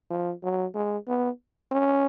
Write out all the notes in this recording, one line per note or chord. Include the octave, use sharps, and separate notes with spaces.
F3
F#3
G#3
B3
C#4